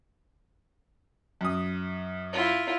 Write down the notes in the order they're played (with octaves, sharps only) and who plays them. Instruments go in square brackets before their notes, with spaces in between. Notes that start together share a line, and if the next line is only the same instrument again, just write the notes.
[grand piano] F#2 D#6
[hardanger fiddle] E4 F4